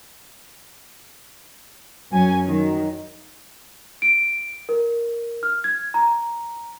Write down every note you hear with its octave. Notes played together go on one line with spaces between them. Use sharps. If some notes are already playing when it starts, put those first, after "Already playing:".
F#2 F#3 C#4 G#5
D#3 F#3
D7
A#4
F6
G#6
A#5